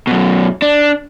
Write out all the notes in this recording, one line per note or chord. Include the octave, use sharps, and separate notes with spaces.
F#2 B2
D4